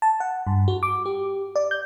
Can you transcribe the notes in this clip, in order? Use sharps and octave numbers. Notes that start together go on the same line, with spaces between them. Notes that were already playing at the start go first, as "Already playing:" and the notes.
A5
F#5
G2
F#4
D6
G4
D5
G6